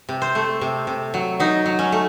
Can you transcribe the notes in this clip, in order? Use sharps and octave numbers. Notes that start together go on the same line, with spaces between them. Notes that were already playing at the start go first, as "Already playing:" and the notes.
C3
C5
A3
C3
C3
F#3
F#3 D#4
F#3
C#4
A3